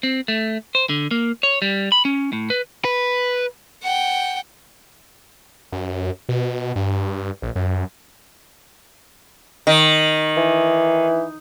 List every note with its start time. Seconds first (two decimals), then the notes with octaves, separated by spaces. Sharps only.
0.03 C4
0.28 A3
0.75 C5
0.89 D3
1.11 A#3
1.43 C#5
1.62 G3
1.92 B5
2.05 C#4
2.33 A2
2.50 B4
2.85 B4
3.83 F#5 G5
5.72 F#2
6.29 B2
6.76 G2
7.42 A#1
7.56 F#2
9.67 D#3
10.37 E3